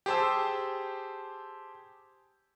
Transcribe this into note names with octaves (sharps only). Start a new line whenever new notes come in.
G4 G#4 C5 A5 E6